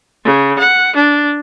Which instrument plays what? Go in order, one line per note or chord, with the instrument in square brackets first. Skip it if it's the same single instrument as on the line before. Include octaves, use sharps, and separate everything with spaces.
[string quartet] C#3
F#5
D4